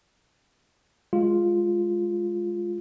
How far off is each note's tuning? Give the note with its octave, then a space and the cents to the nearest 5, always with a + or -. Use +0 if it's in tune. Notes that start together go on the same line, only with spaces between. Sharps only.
G#3 +0 F4 +0